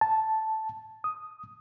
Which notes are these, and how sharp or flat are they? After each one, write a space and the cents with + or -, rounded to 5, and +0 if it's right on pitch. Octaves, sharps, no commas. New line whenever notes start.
A5 -5
D#6 +5